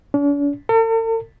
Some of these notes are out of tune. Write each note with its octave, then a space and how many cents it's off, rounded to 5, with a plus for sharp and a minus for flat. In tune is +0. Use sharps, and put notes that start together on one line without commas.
D4 -45
A4 +45